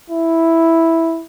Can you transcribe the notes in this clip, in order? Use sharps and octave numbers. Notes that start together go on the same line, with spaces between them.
E4